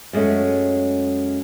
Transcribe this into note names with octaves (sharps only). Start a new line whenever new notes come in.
F#2 G#3 A3 C#4